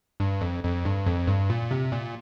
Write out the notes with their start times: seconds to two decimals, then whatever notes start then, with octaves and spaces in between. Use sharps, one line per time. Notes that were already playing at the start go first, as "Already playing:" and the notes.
0.20 G2
0.41 F2
0.63 F2
0.85 G2
1.06 F2
1.27 G2
1.50 A#2
1.71 C3
1.92 A#2